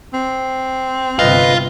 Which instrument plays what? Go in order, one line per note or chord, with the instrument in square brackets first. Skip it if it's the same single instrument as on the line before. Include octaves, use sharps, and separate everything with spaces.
[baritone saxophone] C4
[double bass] G1 C3 [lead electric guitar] F4 [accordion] B4 D#5